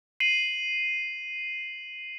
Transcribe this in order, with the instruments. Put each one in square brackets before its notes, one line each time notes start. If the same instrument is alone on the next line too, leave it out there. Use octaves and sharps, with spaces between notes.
[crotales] C7 D#7 F#7